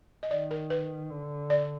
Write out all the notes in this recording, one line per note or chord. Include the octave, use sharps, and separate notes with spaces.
D#5
D#3 D5
A#4
B4
D3
D5